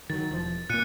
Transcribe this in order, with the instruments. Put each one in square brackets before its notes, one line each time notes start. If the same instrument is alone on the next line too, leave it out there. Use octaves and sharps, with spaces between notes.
[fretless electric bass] D#3 F#3 [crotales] A6
[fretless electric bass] E1 F3 [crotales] A6
[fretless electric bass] A#2 A#3 [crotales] F#6 C#7 D#7